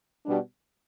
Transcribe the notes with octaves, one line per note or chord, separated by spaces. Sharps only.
B2 G3 D4